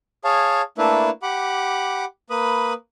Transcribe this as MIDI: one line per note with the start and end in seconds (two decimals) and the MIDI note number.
0.24 0.62 68
0.24 0.62 73
0.24 0.62 77
0.24 0.62 81
0.78 1.10 57
0.78 1.10 58
0.78 1.10 62
0.78 1.10 64
0.78 1.10 71
0.78 1.10 76
1.23 2.05 67
1.23 2.05 78
1.23 2.05 83
1.23 2.05 86
2.30 2.73 58
2.30 2.73 71
2.30 2.73 83
2.30 2.73 87